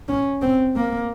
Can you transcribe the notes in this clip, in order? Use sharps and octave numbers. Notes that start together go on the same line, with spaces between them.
C#4
C4
A#3